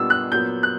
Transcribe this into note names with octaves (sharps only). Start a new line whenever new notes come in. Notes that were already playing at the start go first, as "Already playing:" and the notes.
Already playing: A#2 G3 B3 D4 E6
F#6
A#2 F#3 B3 G6
F#6